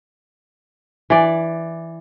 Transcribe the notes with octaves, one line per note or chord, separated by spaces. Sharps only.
E3 D5